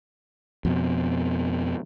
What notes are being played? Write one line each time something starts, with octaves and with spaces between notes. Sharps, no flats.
F2 B2